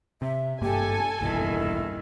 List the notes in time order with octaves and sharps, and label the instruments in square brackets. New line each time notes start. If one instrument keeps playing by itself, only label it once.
[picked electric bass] C3 [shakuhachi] E5
[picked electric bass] G#1 G2 A#3 [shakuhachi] G4 [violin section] A4 G#5
[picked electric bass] F#1 B1 E2 [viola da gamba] G2 A#2 D#3 [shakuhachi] E4